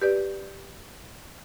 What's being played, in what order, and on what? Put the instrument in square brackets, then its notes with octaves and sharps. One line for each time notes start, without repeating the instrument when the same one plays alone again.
[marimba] G4 B4 D5